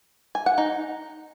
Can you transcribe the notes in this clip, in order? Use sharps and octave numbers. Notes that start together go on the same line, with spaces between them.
G#5
F#5
D#4